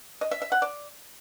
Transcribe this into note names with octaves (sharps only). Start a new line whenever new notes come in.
D#5
E5
E5
F#5
D5